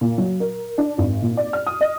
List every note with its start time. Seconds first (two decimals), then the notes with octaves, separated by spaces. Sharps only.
0.01 A#2
0.18 F#3
0.40 A#4
0.78 D4
0.98 G#1
1.22 A#2
1.37 D5
1.53 F6
1.67 D#6
1.81 D#5